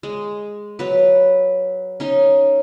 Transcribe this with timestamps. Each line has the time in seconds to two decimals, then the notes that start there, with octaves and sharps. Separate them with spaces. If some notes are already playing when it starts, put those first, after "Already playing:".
0.03 G#3
0.79 F#3 B4
2.00 C#4 D#4 C6